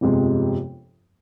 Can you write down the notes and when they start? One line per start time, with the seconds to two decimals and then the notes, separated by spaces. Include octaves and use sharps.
0.01 G1 F2 C3 F3 G#3